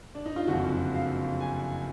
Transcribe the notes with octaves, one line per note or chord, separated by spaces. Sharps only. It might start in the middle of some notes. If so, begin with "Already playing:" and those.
D4
D#4
F4
F#1 F2 D3 F3 F#4
F5
G#5